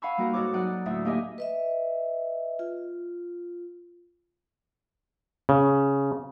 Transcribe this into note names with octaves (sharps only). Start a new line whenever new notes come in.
F5 F#5 G#5 B5 C#6 E6
G3 A#3 D#4 F#4 A#4
G#2 F#4 A4 C#5 D6
F#3 D#4 D5 F#5 D#6 F#6
D2 A2 E5 E6
A#3 D#4 G4 D#5 E5 G#5
B4 D#5 E5
F4
C#3